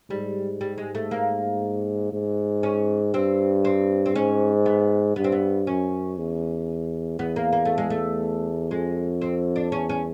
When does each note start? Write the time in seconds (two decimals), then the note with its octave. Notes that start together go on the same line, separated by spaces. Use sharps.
0.10 G#2 G3
0.61 G3
0.78 G#3
0.95 A3
1.11 A#3
2.13 G#2
2.63 C#4
3.14 G2 C4
3.65 C4
4.06 C4
4.15 G#2 C#4
4.66 B3
5.16 G2 B3
5.24 C4
5.32 B3
5.67 F#2 C#4
6.18 E2
7.19 E2 B3
7.36 A#3
7.53 A#3
7.65 A3
7.78 G#3
7.90 A3
8.71 F2 G#3
9.21 C4
9.56 D4
9.72 E2 C#4
9.89 C#4